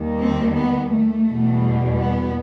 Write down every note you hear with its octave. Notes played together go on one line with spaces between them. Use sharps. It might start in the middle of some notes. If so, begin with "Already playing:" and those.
Already playing: D#2 D#3 G3
C4
B3
A3
E2 B2 G3
B3